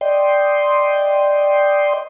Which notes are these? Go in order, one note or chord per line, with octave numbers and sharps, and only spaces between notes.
D5 D#5 G5 C6